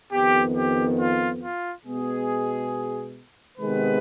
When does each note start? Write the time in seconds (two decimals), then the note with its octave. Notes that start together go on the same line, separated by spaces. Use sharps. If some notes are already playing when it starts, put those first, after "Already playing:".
0.12 F2 D#3 B3 G4
0.55 G4
0.98 F4
1.42 F4
1.84 B2 G#3 B3 G#4
3.58 C3 D#3 G#3 B3 B4